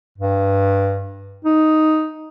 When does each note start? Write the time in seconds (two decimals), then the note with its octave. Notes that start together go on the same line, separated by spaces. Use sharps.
0.18 G2
1.44 D#4